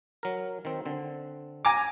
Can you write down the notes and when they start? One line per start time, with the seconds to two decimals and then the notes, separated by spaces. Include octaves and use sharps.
0.23 F#3 A#4
0.65 D#3 C4
0.86 D3 C4
1.65 G#5 A#5 D6